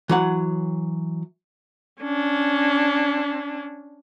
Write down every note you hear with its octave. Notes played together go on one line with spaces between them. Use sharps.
E3 F#3 F#5
C#4 D4